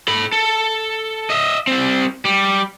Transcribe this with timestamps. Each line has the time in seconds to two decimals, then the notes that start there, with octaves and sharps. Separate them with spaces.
0.08 A4 B5
0.32 A4
1.30 D#5 E5
1.67 G3 C4
2.25 G3